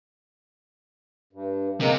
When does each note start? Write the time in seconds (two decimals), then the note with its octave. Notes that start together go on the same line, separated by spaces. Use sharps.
1.33 G2
1.80 C3 G#3 A#3 A#4